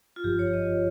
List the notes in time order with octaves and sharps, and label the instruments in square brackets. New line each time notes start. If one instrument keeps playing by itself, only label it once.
[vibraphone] F4
[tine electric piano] G1 G2 F3 [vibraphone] G4
[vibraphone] C#5
D#5